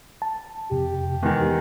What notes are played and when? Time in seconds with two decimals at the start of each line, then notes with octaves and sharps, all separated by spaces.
0.22 A5
0.71 F2 C3 G4
1.23 E2 D#3 G#3